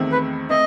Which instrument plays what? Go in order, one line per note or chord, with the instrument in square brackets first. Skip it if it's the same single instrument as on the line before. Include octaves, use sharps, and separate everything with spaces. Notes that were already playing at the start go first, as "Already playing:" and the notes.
Already playing: [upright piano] E2 D#3 A3 C4
[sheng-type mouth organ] B4
[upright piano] A3 C4 [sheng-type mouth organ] D#5